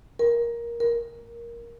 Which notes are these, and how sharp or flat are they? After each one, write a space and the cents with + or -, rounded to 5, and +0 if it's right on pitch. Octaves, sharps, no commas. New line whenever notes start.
A#4 +10
A#4 +5